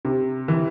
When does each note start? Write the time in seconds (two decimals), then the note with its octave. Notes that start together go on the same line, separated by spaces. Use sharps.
0.05 C3
0.48 E3